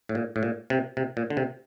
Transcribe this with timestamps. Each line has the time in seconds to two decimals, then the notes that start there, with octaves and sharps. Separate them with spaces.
0.09 A2
0.15 A#2
0.36 A2
0.43 A#2
0.70 C3
0.97 C3
1.17 A#2
1.30 D3
1.37 C3